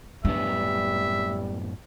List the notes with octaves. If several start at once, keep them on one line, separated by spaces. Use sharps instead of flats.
F#2 A2 G3 B3 D4 E5